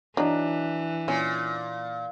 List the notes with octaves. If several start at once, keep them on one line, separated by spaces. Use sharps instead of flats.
E3 F#3 D4 D#4
A#2 C#4